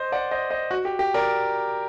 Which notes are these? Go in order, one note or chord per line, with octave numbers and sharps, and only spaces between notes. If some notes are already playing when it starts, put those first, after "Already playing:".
Already playing: C5 D#5
D5 F#5
C5 D#5
C5 D#5
F#4
G4
G4
A#4 D5